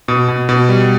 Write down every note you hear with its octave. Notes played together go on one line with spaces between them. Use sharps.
B2
B2
B2
G3